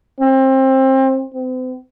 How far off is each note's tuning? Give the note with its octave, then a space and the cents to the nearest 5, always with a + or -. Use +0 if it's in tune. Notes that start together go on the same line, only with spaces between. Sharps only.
C4 +25
C4 -40